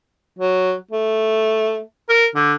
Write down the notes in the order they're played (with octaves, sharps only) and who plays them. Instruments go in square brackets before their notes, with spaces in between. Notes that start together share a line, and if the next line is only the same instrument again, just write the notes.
[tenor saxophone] F#3
A3
A#4
D3